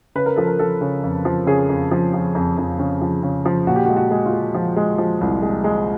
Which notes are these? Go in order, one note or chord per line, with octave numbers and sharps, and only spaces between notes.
C#3 B4
A#4
F3 A4
A#4
F3 A4
C#3
F2
F3
C#3 G#4
F2
F3
F3
F2
F2
C#3
F3
C#3
F3
A#2 F#4
G4
F#4
G#3
F#4
G#3
F4
G#3
F3
G#3
F3
C2
G#3
G#3